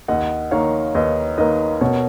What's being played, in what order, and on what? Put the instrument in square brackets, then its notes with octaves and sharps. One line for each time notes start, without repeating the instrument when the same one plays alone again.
[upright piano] D#2 [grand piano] D#5 F#5
[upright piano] D#3 A#3 [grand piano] C#5 F5
[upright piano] D#2 [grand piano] B4 D#5
[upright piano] D#3 A#3 [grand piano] B4 D#5
[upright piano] B2 [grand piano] A#4 C#5